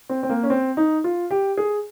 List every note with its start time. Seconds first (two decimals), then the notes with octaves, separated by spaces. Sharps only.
0.09 C4
0.23 C4
0.29 A#3
0.43 C#4
0.50 C4
0.77 D#4
1.04 F4
1.31 G4
1.57 G#4